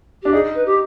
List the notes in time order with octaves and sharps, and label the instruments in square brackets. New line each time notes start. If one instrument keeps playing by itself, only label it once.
[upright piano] D4 [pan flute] G4
[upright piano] D#4 [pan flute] G#4
[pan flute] B4
G4